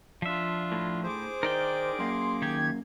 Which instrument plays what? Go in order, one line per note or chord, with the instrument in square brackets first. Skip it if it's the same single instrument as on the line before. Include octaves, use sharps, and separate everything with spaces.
[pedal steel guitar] F3 E5 [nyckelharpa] D4 F4
[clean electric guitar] A2
[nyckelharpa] G#4 D6 [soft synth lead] C5
[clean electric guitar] D#3 [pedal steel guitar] A#4 D5 G5
[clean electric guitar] F#2 A#3 [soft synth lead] C6
[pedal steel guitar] D#3 G4 [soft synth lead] G#6